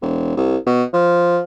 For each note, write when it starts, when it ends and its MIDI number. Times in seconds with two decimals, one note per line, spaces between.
0.02 0.36 28
0.37 0.57 36
0.67 0.84 47
0.93 1.40 53